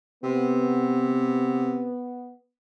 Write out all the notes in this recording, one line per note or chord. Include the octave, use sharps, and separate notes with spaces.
C3 B3